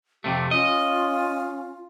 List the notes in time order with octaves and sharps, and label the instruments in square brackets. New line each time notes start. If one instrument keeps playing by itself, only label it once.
[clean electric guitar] F2 C3 A3 [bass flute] G4
[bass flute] C#4 [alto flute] F4 [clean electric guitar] D#5